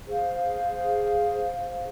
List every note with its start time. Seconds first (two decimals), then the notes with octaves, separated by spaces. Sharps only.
0.07 G#4 C5 F5